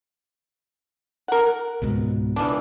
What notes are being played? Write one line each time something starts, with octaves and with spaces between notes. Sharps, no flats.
A#4 F#5
C#2 G#2 B2
E3 F3 D4